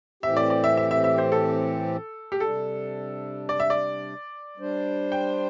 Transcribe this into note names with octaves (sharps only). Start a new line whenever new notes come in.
A2 E3 C4 G4 E5
D5
D5
E5
E5
E5
E5
C5
A4
G4
C3 G3 D4 A4
D5
E5
D5
G3 D4 C5
G5